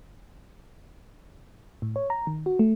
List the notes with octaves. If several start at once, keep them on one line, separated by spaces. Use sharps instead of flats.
A2
C#5
A#5
D#3
F#4
A3